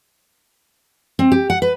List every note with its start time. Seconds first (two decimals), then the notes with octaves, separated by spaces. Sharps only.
1.19 C4
1.32 G4
1.50 F#5
1.62 B4